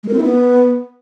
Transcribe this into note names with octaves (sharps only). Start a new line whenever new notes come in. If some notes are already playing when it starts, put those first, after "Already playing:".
G#3
A#4
C4
E4
B3